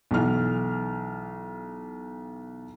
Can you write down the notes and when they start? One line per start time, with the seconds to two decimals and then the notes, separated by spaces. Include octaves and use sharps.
0.11 B1 E3 F6